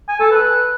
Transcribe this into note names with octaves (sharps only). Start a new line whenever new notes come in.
G#5
A4
B4